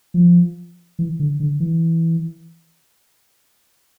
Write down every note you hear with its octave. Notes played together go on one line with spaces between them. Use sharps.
F3
E3
D3
D3
E3